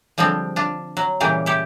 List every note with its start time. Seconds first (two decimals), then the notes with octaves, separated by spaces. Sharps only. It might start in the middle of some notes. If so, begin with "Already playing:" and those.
0.18 D3 F3 G3 G#3 C4
0.56 D4 F4
0.97 F#3
1.20 A#2 C#3 E3 G3 G4
1.46 E4 G4